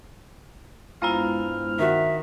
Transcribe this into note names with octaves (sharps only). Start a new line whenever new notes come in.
G2 G#3 B3 E4 F4 C5 A#5 F6
D#3 F#4 E5